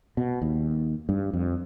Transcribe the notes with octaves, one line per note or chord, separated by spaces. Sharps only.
B2
D#2
G2
F2